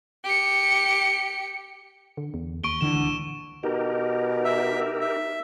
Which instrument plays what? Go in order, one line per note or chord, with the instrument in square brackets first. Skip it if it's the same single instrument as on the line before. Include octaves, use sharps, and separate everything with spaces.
[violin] G4 C#7
[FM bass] D3
E2
[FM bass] D#2 [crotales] C#6 D7 G7
[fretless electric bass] D#1 D3 E3 [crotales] E7
[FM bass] C#2
[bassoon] B2 [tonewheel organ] D#4 G4 A#4
[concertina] E5
E5